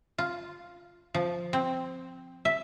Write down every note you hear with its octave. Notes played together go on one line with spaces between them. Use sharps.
F4
F3
C4
E5